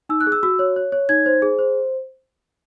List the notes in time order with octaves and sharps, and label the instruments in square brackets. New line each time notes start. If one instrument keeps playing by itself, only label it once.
[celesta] D#4 E6
F#6
G#4
E6
F#4 E6
C#5
C#5
C#5
D#4 G#6
C5
G#4
C5